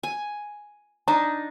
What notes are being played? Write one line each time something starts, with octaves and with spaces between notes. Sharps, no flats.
G#5
D4 D#4 A#5